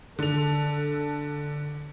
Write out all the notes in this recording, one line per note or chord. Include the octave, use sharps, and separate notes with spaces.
D3 A4 F7